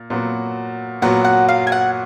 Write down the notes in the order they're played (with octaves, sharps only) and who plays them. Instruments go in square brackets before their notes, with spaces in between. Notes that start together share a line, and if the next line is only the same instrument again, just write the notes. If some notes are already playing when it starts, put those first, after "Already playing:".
Already playing: [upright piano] A#2
A#2 F#3 B3 F#4
[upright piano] A#2 F#3 B3 F#4 [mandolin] F#5
[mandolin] F#5
F5
G#5
F#5